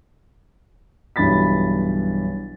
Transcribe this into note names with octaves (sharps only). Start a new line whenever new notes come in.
B1 G2 E3 B5 A6 B6